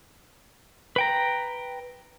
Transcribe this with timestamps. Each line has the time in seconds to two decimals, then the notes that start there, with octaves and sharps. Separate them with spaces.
0.96 B4 G5 A#5